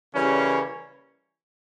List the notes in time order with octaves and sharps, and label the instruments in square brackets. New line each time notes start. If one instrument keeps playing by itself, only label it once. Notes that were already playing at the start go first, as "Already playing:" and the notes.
[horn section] C#3 E3 G3 A#3 C#4